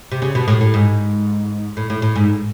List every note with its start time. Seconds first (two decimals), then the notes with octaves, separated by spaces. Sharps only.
0.12 C3
0.22 C#3
0.35 B2
0.48 A2
0.61 A2
0.74 G#2
1.77 A2
1.90 A2
2.02 A2
2.15 G#2